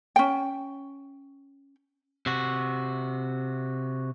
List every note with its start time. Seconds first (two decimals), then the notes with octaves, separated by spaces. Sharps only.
0.16 C#4 G5
2.26 C3 F#4